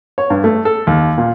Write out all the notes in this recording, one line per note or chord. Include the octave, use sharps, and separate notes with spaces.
C#5
G2
A3
A4
D#2
A#2